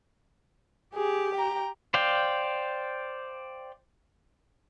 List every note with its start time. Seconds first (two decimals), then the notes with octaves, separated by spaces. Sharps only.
0.95 G4 G#4
1.35 G5 A#5
1.94 C5 D5 F5 G5